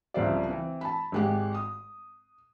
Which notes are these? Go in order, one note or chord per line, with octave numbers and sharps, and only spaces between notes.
C2 F2 C#3 C5 D5
E3 C4
A5 B5
G#1 G#3 G4
D#6